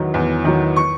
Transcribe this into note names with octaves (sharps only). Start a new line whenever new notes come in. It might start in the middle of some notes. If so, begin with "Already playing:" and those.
Already playing: E2 D#3 F#3
E2
D#3 F#3
C#6